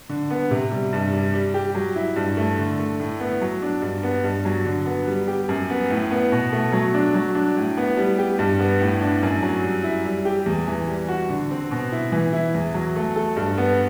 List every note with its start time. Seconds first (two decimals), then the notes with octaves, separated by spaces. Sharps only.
0.09 D3
0.30 B3
0.51 C3
0.71 G3
0.93 G2
1.13 G3
1.34 G3
1.54 G4
1.75 F#3
1.96 E4
2.16 G2
2.37 A3
2.58 D3
2.79 A3
3.00 A2
3.20 B3
3.42 F#3
3.62 D4
3.82 G2
4.03 B3
4.24 G2
4.45 F#3
4.66 D3
4.86 B3
5.08 G3
5.28 G4
5.49 F#2
5.70 B3
5.90 A2
6.11 B3
6.32 B2
6.52 A3
6.72 F#3
6.94 D4
7.14 F#3
7.35 D4
7.57 A2
7.77 B3
7.97 G3
8.18 G4
8.39 G2
8.59 B3
8.80 A2
9.01 D4
9.23 F#2
9.43 F#3
9.63 G3
9.84 E4
10.05 G3
10.25 G4
10.46 E2
10.67 E3
10.88 G3
11.08 F#4
11.30 D3
11.51 C4
11.71 B2
11.92 E4
12.12 E3
12.33 E4
12.54 E2
12.74 F#3
12.96 A3
13.16 A4
13.36 G2
13.58 B3